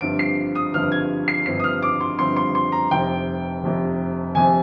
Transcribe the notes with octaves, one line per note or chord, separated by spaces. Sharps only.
G1 G2 F3 C4 D7
C7
D#6
G1 G2 F3 C4 F6
G#6
C7
G1 G2 F3 C4 C7
D#6
F6
D6
C6
G1 G2 F3 C4 C6
C6
C6
A#5
F1 F2 C3 G5
F1 F2 C3
F1 F2 C3 G#5